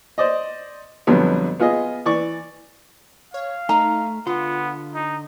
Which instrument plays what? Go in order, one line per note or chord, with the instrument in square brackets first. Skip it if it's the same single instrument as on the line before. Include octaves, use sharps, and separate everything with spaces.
[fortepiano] C5 D5 D#5
F2 B2 D3 F#3 G3 B3
B3 F4 G#4 D#5
E3 D5 C#6
[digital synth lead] C#5 [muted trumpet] F5
[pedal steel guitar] A3 [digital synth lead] D#4 [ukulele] A#5
[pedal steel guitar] D3 F#5 C6 [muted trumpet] B3 [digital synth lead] F4
[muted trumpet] D#4